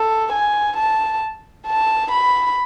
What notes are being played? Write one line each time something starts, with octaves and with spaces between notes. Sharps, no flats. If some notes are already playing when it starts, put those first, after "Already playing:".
Already playing: A4
G#5
A5
A5
B5